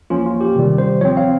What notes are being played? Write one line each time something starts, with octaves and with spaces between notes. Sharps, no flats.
F3 A#3 C#4 F4
F4
G4
C3 D#3 G3
C5
F3 C4 C#5
F5